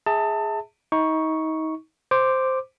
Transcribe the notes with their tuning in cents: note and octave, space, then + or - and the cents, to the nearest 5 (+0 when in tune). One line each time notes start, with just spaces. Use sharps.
G#4 +0 E5 -25 A5 +25
D#4 +30 C#6 +0
C5 -5 D6 +0